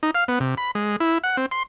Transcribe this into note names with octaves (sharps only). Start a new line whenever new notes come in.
D#4
F5
B3
C3
B5
G#3
E4
F#5
C4
C6